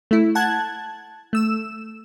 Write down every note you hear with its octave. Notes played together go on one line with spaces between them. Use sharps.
A3 E4
F#5 A5 F#6 G#6
A3 E6 E7